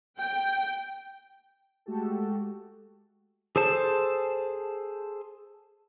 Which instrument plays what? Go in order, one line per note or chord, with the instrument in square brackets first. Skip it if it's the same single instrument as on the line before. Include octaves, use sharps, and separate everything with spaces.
[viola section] G5
[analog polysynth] G#3 A3 F#4 G4 A4
[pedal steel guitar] G#4 A4 C5 A5